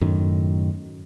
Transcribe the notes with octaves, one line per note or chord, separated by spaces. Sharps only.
F#2 A2 D#3